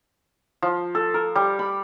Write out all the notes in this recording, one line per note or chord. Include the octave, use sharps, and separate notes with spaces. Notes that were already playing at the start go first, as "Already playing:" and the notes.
F3
A4
A#4
G3
B5